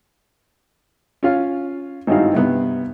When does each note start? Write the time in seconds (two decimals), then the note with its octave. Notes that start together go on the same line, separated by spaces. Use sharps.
1.23 C#4 F4 F5
2.07 G#1 G2 D#4 E4 F#4 F5
2.33 G2 C3 B3